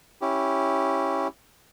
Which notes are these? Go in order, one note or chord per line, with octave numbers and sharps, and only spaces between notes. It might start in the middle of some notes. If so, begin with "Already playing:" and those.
C#4 E4 G4